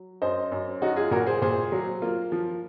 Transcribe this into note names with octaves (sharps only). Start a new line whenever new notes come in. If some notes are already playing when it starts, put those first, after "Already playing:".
Already playing: F#3
F#2 C5 D#5
F#2
F#3 D#4 F#4
F4 G#4
A#2 F#4 A#4
G#4 C5
A#2 G#4 C5
F#3
A#3 F4
F3